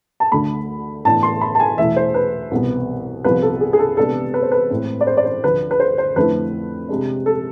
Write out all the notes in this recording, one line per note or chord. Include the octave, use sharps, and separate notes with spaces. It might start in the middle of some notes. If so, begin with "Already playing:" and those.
A5
D2 D3 A3 B5
A2 E3 B3 D4 A5
C6
B5
A5
G#5
E2 B2 A3 E4 E5
C5
B4
C2 B2 B3
C2 C3 F3 B3 B4
A4
G#4
G#4
A4
C3 G#3 B3 D4 A4
B4
C5
B4
A2 G#3 C4
D5
C5
D5
C5
D2 D3 F3 B4
B4
C5
C5
F2 D3 A3 C4 E4 B4
C3 G#3 D4
A4